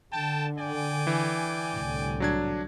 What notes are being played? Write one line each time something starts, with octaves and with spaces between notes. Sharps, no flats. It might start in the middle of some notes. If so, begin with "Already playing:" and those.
D3 G5 A5
D5 G5 G#5
E3
C2 A2 D3
F#3 D4 G#6